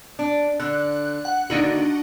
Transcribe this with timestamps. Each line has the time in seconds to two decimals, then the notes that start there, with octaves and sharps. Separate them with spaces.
0.19 D4
0.60 D3 F#6
1.25 F#5
1.50 D3 D#3 A#3 D4 D#4 F#4